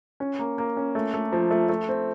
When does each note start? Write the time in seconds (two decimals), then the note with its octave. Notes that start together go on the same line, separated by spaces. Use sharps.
0.20 C#4
0.39 A#3
0.58 A#3
0.77 C#4
0.95 A3
1.14 A3
1.32 F3
1.51 A3
1.69 A3
1.88 C4